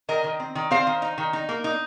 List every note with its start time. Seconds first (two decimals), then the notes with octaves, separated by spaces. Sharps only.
0.09 D#3 A#4 D#5
0.24 D#3
0.40 C4
0.55 D#3
0.71 C4 C5 F5
0.87 D#3
1.02 D#4
1.18 D#3
1.33 D#4
1.49 A#3
1.64 D#4